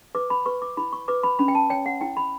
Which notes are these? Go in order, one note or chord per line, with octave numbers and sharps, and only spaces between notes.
B4 D6
B5
B4 C#6
D6
E4 B5
C#6
B4 D6
B5
C#4 B5
G5
A5
C#5 G5
F#5
E4 G5
B5